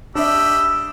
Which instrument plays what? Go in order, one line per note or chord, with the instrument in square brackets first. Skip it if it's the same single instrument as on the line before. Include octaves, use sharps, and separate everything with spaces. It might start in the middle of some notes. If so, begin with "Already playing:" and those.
[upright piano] D4 E5 [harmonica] G4 D#5 B5 [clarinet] E6